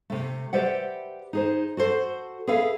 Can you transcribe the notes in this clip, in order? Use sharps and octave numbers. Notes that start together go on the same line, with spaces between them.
C3 A3
G4 B4 C5 D5 E5 F#5
D#4 G#4 C5
F#4 A4 C5
G#4 A4 B4 E5 F5